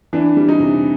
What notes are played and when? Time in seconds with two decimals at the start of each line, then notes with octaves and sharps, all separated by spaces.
0.13 E3 D4
0.36 G3
0.49 D#4
0.60 C3